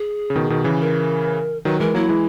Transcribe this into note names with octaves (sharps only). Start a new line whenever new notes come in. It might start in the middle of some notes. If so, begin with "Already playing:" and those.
Already playing: G#4
C#3
B2 D#3
B2 D#3
C#3 E3
A#4
D#3 F#3 B4
E3 G#3 A#4
F#3 A#3 E4
E3 G#3